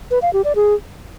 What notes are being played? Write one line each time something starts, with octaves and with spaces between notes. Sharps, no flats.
B4
F5
G4
D5
G#4